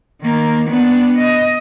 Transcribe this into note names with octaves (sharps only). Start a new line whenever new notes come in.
D#3 A#3
B3 D4
D#5